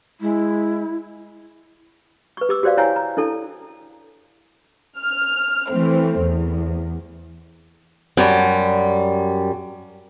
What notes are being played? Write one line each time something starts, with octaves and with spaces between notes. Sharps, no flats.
G#3 E4
B4 C#6
G4 D6 E6
F#4 G4 C5 D5 F5
E4 C#5 F5 G5 G#5 A#5
A#5
D4 E4 A4 A5
F6
E3 A3 C4
E2
F#2 G3